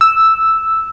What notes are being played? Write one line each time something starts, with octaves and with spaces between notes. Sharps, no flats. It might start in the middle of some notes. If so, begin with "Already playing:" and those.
E6